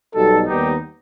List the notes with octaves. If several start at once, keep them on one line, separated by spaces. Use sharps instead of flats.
B1 B2 G3 D#4 A4
D#2 D#3 G3 B3 D#4 G4